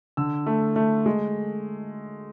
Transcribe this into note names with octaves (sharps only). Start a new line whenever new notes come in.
D3 E6
A3
A3
G#3